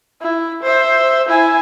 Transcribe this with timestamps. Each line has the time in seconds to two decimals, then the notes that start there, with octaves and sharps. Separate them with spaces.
0.22 E4
0.63 C5 E5
1.29 E4 G#5